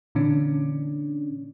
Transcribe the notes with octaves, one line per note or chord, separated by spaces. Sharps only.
A#2 D3 E3 C#4 D4